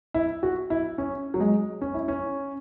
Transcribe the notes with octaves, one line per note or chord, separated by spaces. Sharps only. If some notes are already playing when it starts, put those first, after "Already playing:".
E4
F#4
E4
C#4
F#3
G#3
C#4
E4
C#4